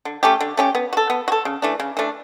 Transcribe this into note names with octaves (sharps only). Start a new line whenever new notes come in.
D3
A3 C#4 G4
D3
A3 C#4 G4
B3
F#4
A4
B3
F#4
A4
C#3
E3 A3 D4
C#3
E3 A3 D4